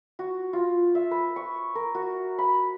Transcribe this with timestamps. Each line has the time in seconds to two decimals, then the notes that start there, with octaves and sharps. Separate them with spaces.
0.19 F#4
0.53 F4
0.95 E5
1.11 B4
1.36 C#6
1.75 A#4
1.95 F#4
2.38 B5